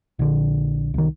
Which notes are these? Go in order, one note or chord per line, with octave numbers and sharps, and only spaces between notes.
A#1 D3
C2 D#3